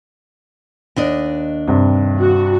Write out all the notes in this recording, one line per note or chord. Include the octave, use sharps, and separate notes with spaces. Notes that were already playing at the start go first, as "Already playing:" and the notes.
D#2 D4 D#5
G2 C3
F#4